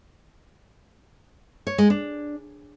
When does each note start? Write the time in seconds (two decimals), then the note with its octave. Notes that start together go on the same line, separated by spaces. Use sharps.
1.67 C#5
1.78 G#3
1.90 D4